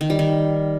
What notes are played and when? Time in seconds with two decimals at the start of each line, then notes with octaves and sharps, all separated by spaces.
0.01 D#3
0.10 G3
0.19 D#3